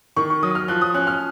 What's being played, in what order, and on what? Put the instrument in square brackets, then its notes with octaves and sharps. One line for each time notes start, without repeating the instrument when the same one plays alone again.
[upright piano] D#3 C#6
C#6
F#3 D#6
F6
F3 F#6
D#6
C#4 F#6
F6